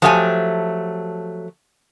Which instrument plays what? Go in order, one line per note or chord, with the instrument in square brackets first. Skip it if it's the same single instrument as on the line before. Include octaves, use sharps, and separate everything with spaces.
[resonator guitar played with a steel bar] F3 F#3 A3 G4 G5 G#5